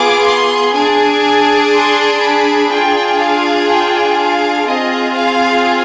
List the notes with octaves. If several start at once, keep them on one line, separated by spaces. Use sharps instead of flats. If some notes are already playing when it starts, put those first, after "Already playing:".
Already playing: B3 F4 G#4 D6
C6
D4 G#4 G#5
C6
B5
D4 F4 G#4 G5
F5
G5
F5
C4 F4 G#4 D#5
F5